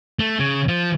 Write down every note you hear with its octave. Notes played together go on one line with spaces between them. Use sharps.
A3
C#3
F3